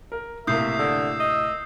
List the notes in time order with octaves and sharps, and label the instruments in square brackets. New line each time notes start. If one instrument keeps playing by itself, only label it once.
[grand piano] A#4
[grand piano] A2 C3 A#3 [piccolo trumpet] E5 [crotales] D#6 G6 C7
[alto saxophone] D3 [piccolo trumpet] E6
[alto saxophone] D#5